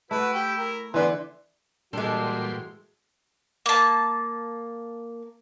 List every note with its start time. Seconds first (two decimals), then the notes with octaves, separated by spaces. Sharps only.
0.11 A3 E4 F#4 B4
0.34 G4 G5
0.58 A#4
0.94 D3 E3 B3 C6
1.93 A#2 E3 G3 G#3 D4 F#4 A4 C6
3.66 A#3 A5